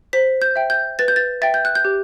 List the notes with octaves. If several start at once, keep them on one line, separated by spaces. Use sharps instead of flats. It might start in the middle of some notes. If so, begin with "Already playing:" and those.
C5 B6
G6
E5 G5
G6
B4 A6
G6
A6
E5 G5 A6
G6
F#6
G6
G4